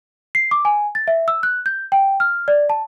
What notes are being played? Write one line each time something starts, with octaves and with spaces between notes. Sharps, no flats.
C7
D6
G#5
A6
E5
E6
F#6
G6
G5
F6
D5
A5